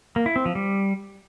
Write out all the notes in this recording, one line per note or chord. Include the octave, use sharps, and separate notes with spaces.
A#3
E4
C4
F3
G3